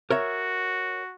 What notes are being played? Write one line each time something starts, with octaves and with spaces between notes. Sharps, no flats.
F#4 A#4 C#5 E5